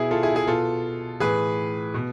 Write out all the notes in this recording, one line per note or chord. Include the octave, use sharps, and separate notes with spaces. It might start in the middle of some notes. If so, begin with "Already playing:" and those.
Already playing: B2 E4 G#4
F4 A4
E4 G#4
E4 G#4
B2 F4 A4
A2 E3 G#4 B4
B2